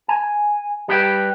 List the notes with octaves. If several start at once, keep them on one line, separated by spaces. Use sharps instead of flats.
G#5
G3 G4 B4 G5